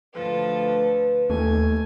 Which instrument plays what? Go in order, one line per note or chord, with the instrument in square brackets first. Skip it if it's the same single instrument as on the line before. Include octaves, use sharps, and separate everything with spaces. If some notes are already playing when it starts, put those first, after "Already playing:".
[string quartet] D2 F3 A4 [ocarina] B4
[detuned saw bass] D#2 [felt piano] A3 [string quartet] G#5